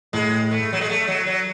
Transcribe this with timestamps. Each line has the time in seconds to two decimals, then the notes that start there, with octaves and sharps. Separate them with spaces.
0.13 A2 G#3
0.51 A3
0.73 F#3
0.81 G#3
0.90 A3
1.08 F#3
1.27 F#3